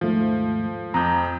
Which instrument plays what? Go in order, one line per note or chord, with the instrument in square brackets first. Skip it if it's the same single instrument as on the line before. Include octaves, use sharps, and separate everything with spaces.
[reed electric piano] D#2 G#2 A3 [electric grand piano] F3
[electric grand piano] F2 [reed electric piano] A#5 D#6 G6